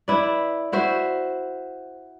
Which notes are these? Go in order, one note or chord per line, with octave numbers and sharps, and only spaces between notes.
E4 B4 D5
E4 F#4 C5 E5